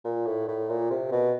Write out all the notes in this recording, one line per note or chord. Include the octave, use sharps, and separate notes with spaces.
A#2
A2
A2
A#2
C3
B2